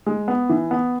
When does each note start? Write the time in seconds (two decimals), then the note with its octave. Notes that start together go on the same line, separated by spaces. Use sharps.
0.06 G#3
0.28 B3
0.49 E3
0.71 B3